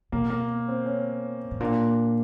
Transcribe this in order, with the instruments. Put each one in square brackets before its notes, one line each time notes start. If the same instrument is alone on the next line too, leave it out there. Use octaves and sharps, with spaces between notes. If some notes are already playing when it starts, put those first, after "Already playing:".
[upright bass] B2 [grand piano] A#3
[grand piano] A#3
C4
C#4
[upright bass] A2
[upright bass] A#2 [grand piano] D4